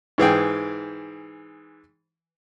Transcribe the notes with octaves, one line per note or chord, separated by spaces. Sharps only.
G#2 E3 G#4 G5